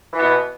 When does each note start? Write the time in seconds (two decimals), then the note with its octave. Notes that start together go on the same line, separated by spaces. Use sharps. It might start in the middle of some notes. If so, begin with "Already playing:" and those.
0.13 E3
0.17 B3
0.22 B2